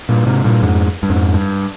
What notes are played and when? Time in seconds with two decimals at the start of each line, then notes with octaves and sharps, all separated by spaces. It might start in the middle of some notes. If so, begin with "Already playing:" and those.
0.09 G2 A#2
0.26 G#2 C3
0.44 G2 A#2
0.62 F2 G#2
1.03 G2
1.10 F2 G#2
1.34 G2